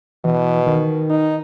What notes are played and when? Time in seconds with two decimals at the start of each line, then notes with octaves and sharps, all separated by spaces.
0.25 B2 E3
0.66 D#3
1.10 D#4